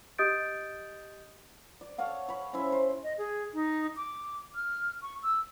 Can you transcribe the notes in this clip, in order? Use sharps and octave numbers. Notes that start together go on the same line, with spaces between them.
G4 D#5 D#6 G6 A6 D7
D5
A4 C#5 F5 F#5
C#5 B5
C#4 E4 C5 E5
C5
D#5
G#4
D#4
D6
F6
C#6
E6